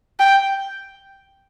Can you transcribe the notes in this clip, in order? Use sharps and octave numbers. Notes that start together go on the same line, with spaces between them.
G5